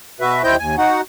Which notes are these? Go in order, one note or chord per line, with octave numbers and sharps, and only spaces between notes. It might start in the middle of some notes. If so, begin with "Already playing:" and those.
B2 F#4 B4 E5
D#2 E4 C5 D#5 G5 G6
D#2 G#5
D#4 F#4 F#5